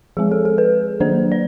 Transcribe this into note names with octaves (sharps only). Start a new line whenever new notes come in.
F3 G#3 C4 G#4
A4
A4
B4
D#3 F#3 A#3 D4 C5
D5